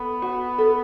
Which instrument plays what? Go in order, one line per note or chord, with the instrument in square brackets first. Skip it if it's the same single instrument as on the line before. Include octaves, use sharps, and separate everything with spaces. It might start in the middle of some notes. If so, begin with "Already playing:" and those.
Already playing: [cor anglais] B3 [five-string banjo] A4
[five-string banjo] F#4
A4